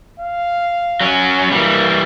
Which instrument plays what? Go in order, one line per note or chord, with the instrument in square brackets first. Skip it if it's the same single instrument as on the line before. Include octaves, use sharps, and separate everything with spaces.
[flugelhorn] F5
[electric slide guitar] F#3 C#4
[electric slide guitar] E3 G3 [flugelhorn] A#3